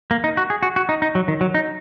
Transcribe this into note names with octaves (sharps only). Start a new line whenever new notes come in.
A#3
D#4
F#4
G#4
F#4
F#4
D#4
D#4
F#3
D#3
F#3
D#4